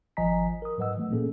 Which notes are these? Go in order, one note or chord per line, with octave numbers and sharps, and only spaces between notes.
G#1 F3 D#5 G#5 A#5 B6
A#4 D#6
G#2 F#3 B4 D#5 F#5 E6
E3 A3
A#2 A#3 C#4 G#4 A4